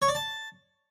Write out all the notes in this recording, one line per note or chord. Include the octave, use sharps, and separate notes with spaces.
C#5
D5
A5